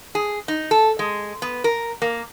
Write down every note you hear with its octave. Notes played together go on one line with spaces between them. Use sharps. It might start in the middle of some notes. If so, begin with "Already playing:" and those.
G#4
D#4
A4
G#3
B3
A#4
A#3